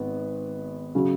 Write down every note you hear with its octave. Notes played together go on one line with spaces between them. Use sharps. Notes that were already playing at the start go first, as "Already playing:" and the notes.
Already playing: G#1 B3
C#3 F#3